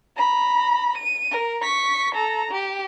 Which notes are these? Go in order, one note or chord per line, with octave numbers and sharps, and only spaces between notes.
A#5 B5
D#7
A#4
C#6 B6
A4 A#5
G4